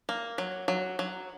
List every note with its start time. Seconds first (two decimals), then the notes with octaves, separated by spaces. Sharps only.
0.09 A#3
0.38 F#3
0.68 F#3
0.99 F#3